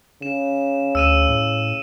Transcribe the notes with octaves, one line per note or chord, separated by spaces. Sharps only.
C#3 E7
D2 E6 D#7 E7
A2